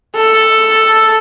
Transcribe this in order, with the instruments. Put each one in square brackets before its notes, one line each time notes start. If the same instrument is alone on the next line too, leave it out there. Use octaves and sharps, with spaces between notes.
[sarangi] A4